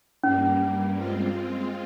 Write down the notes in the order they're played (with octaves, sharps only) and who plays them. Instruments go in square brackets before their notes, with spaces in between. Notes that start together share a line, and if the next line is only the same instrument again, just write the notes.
[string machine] G2 G3 A#3 [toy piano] C#4
[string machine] G#3 C4 F4